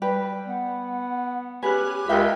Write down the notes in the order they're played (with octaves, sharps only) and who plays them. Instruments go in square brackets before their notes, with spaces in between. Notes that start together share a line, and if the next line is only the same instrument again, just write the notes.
[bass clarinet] G3 [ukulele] B4 G5
[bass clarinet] B3 [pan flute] F#5
[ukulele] C#4 G#4 B4 [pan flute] G4 [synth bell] G#5 F#6
[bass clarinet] C#2 [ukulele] G#4 E5 F5 [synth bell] A#4 G5 B5